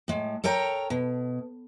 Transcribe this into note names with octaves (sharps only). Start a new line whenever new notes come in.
A2 G#3
A4 A#4 C#5 G5 A#5
B2